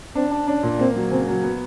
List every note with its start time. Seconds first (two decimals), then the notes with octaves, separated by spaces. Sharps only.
0.15 C4 D4
0.31 D4
0.47 C#4 D4
0.63 A#2
0.79 A#3 C4
0.96 F#3
1.11 C#3 C4
1.28 F#3
1.44 B3